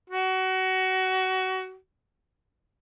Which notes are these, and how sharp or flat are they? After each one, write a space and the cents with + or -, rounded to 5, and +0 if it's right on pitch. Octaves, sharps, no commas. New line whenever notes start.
F#4 +25